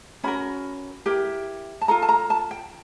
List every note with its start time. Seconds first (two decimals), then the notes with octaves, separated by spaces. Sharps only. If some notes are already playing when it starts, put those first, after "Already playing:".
0.24 C#4 F#4 A#4 B5
1.06 E4 G4 A#4
1.81 A5
1.88 F4 A4 A#5
2.02 A5
2.09 A#5
2.30 A5
2.51 G5